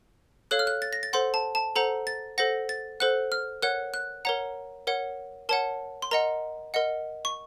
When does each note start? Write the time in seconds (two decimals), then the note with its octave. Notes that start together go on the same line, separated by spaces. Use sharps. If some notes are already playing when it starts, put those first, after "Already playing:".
0.51 A4 C#5 F5 F#6
0.59 F6
0.67 F#6
0.82 A6
0.93 A#6
1.03 A6
1.13 A4 C5 F#5 C6
1.34 A5
1.55 A5
1.76 A4 C5 F#5 A#5
2.07 A6
2.38 A4 C5 F#5 A#6
2.69 A6
3.00 A4 C5 F#5 F#6
3.32 F6
3.62 A#4 C#5 F#5 F#6
3.94 F#6
4.25 A#4 C#5 F#5 A#5
4.87 A#4 C#5 F#5
5.49 A#4 C#5 F#5 A5
6.02 C6
6.11 A#4 D#5 F#5 A#5
6.74 A#4 D#5 F#5
7.25 C#6